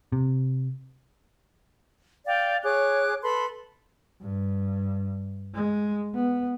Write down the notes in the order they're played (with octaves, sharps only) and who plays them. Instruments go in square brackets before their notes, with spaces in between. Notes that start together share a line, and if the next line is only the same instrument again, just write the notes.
[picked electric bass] C3
[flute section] D5 F5 G5
G#4 C#5 D6 F#6
A4 B4 B5 C6
[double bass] G2
G#3
B3